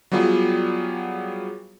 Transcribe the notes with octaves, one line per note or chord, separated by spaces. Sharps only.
F#3 G3 B3 F4 G#4